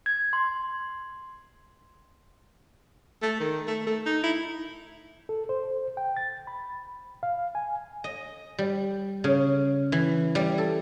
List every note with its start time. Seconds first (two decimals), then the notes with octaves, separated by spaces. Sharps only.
0.06 G#6
0.33 C6
3.22 A3
3.40 D#3
3.68 A3
3.87 A3
4.06 D#4
4.23 E4
5.29 A4
5.49 C5
5.97 G5
6.17 A6
6.47 B5
7.23 F5
7.55 G#5
8.04 D#5
8.59 G3
9.24 C#3
9.92 E3
10.35 G3
10.58 A4